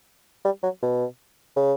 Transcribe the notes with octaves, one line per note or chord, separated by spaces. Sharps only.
G3
F#3
B2
C#3